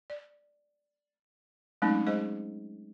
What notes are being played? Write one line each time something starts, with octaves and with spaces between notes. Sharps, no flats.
D5
F#3 G#3 A3 C4 C#4 D#4
G#3 G#4 C5 D#5